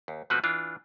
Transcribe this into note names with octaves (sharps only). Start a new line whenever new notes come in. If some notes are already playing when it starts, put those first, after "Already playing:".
D#2
B2 F3 A3 C4 F#4 B4
E3 D4 F4